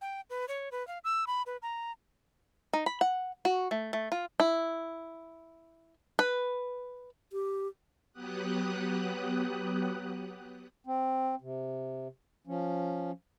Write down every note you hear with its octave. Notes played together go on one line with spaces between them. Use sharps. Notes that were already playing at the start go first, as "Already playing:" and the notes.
G5
B4
C#5
B4
F5
E6
B5
B4
A#5
D#4
B5
F#5
F#4
A3
A3
F4
E4
B4
G4
F#3 B3 G4 D#6 F#6
C4
C3
F3 C#4